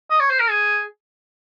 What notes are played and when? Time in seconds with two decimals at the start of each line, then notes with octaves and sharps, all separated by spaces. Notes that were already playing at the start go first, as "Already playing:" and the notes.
0.10 D#5
0.20 C#5
0.30 C5
0.40 A#4
0.50 G#4